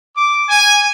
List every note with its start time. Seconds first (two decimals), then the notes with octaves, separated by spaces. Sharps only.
0.17 D6
0.49 G#5